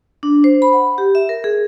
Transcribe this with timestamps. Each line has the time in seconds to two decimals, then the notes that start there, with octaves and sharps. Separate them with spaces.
0.23 D4
0.44 C5
0.62 B5
0.73 F#5
0.98 G4
1.15 E5
1.29 A#4
1.44 G#4